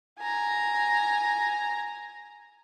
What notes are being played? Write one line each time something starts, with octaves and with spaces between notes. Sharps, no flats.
G#5 A#5